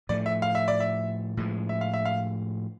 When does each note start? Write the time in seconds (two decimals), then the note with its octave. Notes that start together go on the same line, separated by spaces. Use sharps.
0.09 A2 F3 A3 D5
0.26 E5
0.42 F5
0.55 E5
0.68 D5
0.80 E5
1.37 A2 F3 G#3
1.69 E5
1.81 F5
1.94 E5
2.05 F5